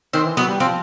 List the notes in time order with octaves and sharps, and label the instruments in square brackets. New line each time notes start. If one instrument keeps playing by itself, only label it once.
[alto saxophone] D#3 [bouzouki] C4
[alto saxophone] E3
[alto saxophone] F#3 [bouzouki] B3
[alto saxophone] G3
[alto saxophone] F3 [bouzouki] C4